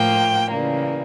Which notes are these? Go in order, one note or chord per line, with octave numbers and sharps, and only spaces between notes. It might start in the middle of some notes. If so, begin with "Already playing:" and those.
Already playing: A2 F3 A#3 G5
C#3 E3 G3 A#3